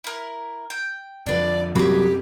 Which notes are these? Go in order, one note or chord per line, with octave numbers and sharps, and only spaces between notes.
E4 A#4
G5
F2 D3 F3 D4 B4 D5
C2 F#2 F#3 A#3 C4 G4 G#4 B5